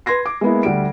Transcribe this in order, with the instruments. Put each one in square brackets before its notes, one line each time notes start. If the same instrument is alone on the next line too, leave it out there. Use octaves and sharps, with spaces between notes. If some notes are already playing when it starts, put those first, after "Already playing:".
[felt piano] B4 C6 G#6 A#6 C7
D6
G#3 A#3 B3 E4
D2 G3 D7